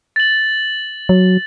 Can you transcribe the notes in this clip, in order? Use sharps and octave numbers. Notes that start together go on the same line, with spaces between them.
A6 F#7
F#3